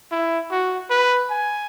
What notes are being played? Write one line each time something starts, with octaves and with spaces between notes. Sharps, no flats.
E4
F#4
B4
G#5